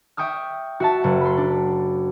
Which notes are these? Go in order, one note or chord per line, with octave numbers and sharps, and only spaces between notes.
E5 G5 C#6 D#6 F6
F#4 E5 A5
F#1 F#5
B5 C6
D4